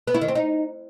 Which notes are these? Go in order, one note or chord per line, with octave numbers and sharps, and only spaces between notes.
B3
E4
D#3
C4
D#4